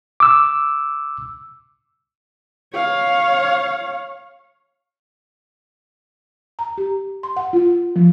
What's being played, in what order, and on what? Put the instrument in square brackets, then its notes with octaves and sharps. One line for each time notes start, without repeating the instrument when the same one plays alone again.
[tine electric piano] D6 E6
[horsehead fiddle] C#5 F5
[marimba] A#5
G4
C6
F#5
F4
F3